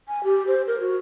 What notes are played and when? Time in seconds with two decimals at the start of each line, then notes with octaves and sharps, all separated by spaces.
0.08 G#5
0.24 G4
0.47 C5
0.67 A#4
0.80 F#4